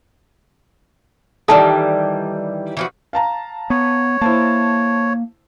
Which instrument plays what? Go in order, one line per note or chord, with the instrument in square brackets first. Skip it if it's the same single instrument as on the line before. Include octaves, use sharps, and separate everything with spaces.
[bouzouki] D#3 E3 G3 [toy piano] A4 A5
[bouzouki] E3 F3 F#4
[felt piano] F5 A5 A#5
[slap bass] B3 [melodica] C#5
[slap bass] A#3 [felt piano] E4 C5 A5